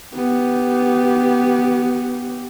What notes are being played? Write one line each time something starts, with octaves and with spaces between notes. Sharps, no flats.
B3 G4